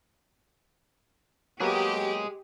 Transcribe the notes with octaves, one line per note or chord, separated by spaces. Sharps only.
F#3 A#3 B3 G4 G#4 D#5